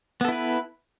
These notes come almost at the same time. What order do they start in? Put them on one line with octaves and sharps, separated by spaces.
B3 A4 E4 B4